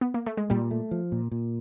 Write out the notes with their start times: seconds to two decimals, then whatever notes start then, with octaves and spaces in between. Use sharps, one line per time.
0.01 B3
0.14 A#3
0.26 A3
0.37 G#3
0.50 A#2 G3
0.71 A3
0.91 F3
1.12 A#2
1.31 A#2